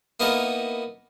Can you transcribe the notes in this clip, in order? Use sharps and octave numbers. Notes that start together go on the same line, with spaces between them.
A#3 B3 D#4 E4 A4 A#4